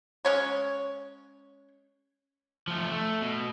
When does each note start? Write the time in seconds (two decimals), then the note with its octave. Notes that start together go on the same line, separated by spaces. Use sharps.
0.25 G#3 C#4 C#5
2.67 F3 A3
2.91 A3
3.21 B2